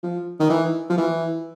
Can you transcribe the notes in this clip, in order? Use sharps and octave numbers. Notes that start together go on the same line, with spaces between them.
F3
D#3
E3
F3
E3